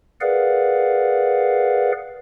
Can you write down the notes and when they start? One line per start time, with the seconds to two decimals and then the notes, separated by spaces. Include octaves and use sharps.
0.21 G#4 A#4 B4 D5 F5 F#5